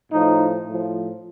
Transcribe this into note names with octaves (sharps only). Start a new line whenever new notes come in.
A2 F3 D#4
A2 F3